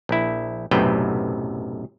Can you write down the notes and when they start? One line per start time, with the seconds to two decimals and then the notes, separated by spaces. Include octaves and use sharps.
0.09 A#1 E4
0.71 B1 F#2 A2 C3 B4 G5